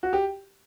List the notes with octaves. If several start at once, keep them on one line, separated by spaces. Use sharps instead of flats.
F#4
G4